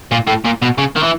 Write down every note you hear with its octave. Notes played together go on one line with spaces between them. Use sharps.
A#2
A2
A#2
B2
C#3
D#3
E3